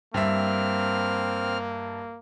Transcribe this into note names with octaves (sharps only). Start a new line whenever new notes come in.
G2 A#3 C4 E5 F6